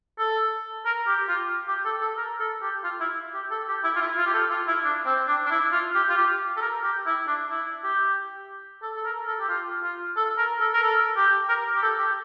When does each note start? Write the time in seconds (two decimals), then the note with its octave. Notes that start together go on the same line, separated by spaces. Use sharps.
0.19 A4
0.85 A#4
1.07 G4
1.20 G4
1.28 F4
1.68 G4
1.85 A4
2.01 A4
2.17 A#4
2.40 A4
2.62 G4
2.84 F4
3.00 E4
3.34 G4
3.51 A4
3.68 G4
3.84 E4
3.96 F4
4.01 E4
4.18 F4
4.26 G4
4.34 A4
4.50 F4
4.68 E4
4.84 D4
5.06 C4
5.28 D4
5.46 D4
5.50 E4
5.72 F4
5.95 G4
6.09 F4
6.17 G4
6.56 A4
6.61 A#4
6.83 G4
7.06 E4
7.27 D4
7.50 E4
7.84 G4
8.82 A4
8.96 A4
9.05 A#4
9.27 A4
9.40 G4
9.49 F4
9.83 F4
10.16 A4
10.38 A#4
10.61 A4
10.73 A#4
10.82 A4
11.16 G4
11.49 A#4
11.75 G4
11.82 A4
11.99 G4